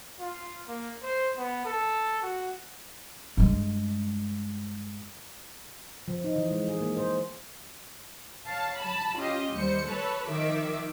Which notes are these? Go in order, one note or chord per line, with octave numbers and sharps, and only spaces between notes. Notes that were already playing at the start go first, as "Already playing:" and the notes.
F4
A#3
C5
B3
A4
F#4
G2 G#3
F3
D#4
E3
G#3
G#4
A#3
C5
C#5 F5 A5
A5 B5
C#4 F4 G4 D#5
D#2 G3 C5 C#7
A4 B4 C#5 A5
D#3 F3 E5 D6